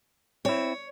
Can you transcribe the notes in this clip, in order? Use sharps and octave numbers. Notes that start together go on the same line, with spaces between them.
C4 E4 C#5